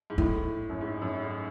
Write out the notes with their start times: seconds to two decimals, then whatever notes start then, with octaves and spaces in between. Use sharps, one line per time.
0.10 G#2
0.18 A2 E4
0.70 F#2
0.81 G#2
1.02 F#2
1.23 G#2